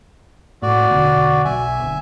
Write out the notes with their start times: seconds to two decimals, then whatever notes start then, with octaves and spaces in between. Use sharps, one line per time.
0.62 A2 F#4 D5
0.90 E1 D2 B2
1.45 B1 E5 G#5
1.79 D1